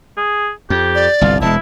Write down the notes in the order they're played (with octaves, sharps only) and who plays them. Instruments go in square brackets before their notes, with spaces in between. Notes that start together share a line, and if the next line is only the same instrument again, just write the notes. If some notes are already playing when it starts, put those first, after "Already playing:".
[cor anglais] G#4
[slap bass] F2 [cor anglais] G4
[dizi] D5
[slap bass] G1 C2 [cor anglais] F4
[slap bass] E1 G#3 [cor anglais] E4 [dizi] A5